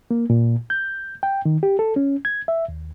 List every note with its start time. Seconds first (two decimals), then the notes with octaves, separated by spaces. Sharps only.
0.11 A#3
0.30 A#2
0.70 G6
1.23 G5
1.45 D#3
1.63 G4
1.79 A4
1.96 C#4
2.25 G#6
2.48 E5
2.68 D#2